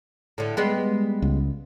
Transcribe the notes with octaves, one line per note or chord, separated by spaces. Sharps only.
A2 D3
G3 G#3 B3
C#2